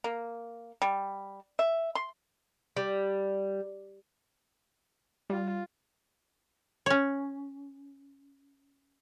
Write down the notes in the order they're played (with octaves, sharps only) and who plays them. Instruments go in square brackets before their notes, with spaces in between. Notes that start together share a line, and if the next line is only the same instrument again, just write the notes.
[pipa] A#3
G3
E5
C6
[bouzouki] G3
[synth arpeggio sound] G3 [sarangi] F4
[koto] C#4 C#5